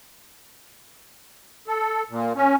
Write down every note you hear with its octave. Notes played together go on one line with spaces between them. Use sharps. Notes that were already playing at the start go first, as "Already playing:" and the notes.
A4
A#2
C#4